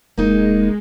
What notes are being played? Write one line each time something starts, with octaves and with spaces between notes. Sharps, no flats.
E1 G#3 A#3 D#4